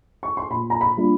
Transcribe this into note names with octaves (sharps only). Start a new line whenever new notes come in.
C#6
C6
A#2 B5
A#5
B5
G3 A#3 D4 F4